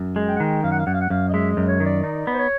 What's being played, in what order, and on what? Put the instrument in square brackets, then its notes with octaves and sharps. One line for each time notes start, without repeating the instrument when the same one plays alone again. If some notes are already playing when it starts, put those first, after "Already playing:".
Already playing: [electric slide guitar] F#2
G#3
[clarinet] G5
F#5
[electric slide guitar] D#3 [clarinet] G5
[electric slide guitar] F#2 [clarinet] F5
[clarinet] F#5
F5
[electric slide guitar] F#2 [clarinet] F#5
[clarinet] F5
F#5
[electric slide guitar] F#2 [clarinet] F5
[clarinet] D#5
[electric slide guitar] G#3 [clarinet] E5
[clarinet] D#5
[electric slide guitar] F#2
[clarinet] C#5
[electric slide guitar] D#3
[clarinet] D5
[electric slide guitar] D#4 [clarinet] D5
[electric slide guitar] B3
[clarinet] C5
C#5